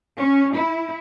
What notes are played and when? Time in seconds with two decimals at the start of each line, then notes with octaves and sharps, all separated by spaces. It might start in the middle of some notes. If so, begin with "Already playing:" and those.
0.19 C#4
0.55 E4